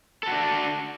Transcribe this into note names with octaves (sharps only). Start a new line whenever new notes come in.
D4 F#4 A4